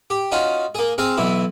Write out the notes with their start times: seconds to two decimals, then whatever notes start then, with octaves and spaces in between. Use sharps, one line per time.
0.10 G4
0.32 C#4 D#4 F4 F#4
0.75 A#3 G#4
0.98 C4 G#4 F5 A#5 C6
1.17 B1 B2 E3 E4